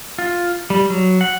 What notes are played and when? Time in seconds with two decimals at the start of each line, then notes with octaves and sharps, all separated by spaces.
0.18 F4
0.70 G3
0.90 F#3
1.21 F#5